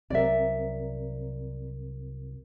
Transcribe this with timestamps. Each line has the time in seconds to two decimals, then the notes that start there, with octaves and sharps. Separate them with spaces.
0.10 C2 C3 F#3 C4 A#4 D5 E5